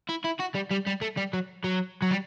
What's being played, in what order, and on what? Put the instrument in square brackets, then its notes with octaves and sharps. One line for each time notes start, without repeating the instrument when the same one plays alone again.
[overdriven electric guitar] E4
E4
F#4
G3
G3
G3
A3
G3
F#3
F#3
F#3
G3